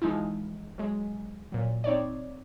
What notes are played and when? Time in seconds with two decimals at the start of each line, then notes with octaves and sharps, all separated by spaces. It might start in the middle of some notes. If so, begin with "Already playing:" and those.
0.02 E3 F3 G#3 D#4 E4
0.78 F#3 G#3
1.52 A#2 F#3
1.84 C4 D#4 C#5 D5